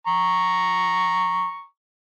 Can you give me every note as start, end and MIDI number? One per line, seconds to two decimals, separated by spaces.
0.07 1.65 82
0.07 1.65 85